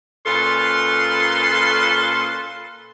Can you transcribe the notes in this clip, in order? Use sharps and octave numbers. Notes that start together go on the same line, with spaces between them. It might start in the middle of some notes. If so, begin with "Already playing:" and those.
A#2 C#4 F4 A4 B4 C6